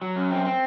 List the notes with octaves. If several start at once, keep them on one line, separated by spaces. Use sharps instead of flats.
F#3
F#2
C4
C4